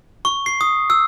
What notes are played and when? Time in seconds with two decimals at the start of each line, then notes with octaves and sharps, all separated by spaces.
0.25 C#6
0.46 C7
0.61 D#6
0.90 E6